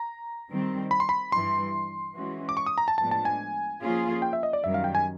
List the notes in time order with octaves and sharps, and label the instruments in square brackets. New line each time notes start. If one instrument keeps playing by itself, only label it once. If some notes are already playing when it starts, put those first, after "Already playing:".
Already playing: [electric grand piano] A#5
[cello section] D#3 G3 C4
[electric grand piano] B5
C6
B5
[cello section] G2 E3 G3 [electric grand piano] C6
[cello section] E3 G#3 C#4 F#4
[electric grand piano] D6
C#6
D#6
A#5
A5
[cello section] A2 F3 G#3 B3 D4 [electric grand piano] A5
[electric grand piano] A5
G#5
[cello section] F3 A#3 C#4 F4 G#4
[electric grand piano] G5
E5
D#5
D5
[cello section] F#2 D#3 G3 [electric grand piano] E5
[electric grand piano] F5
G5
G#5